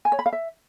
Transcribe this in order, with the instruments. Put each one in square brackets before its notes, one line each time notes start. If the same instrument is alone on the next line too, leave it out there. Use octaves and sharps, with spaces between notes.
[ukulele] G#5
C#5
B5
F5
E5